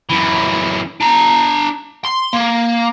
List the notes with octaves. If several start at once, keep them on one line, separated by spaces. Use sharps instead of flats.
F#2 E3
D4 A#5
C6
A#3